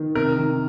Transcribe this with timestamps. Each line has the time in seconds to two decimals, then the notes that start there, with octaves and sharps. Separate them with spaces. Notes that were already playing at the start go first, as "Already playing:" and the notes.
Already playing: D#3
0.15 C3 A#4
0.38 D#3